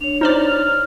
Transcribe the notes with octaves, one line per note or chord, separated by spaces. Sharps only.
D4 C#5 F7
D#4 C5 D5 F6